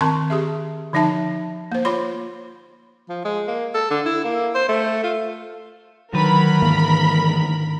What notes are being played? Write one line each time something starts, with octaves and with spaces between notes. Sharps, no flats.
D#3 C4 A#4 A5 C6 C#6
G4 G#4 E5
D3 F3 D#4 E5 A5
A#3 C5
F4 C#5 B5 C6
F3
G#3
A#3
A4
D3
E4
A#3
C5
A3
F4
D3 D#3 F#3 A#4 B4 B5
G#2 E3 A#3